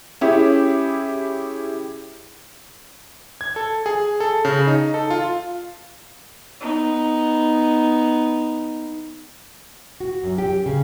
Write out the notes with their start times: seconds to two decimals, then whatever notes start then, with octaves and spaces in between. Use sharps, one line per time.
0.21 C#4 E4 G4 G#4
3.41 G#6
3.56 A4
3.86 G#4
4.20 A4
4.45 C#3
4.67 D#4
4.94 A4
5.10 F4
6.61 B3 D#4
10.00 F#4
10.24 F#2
10.38 G4
10.66 C#3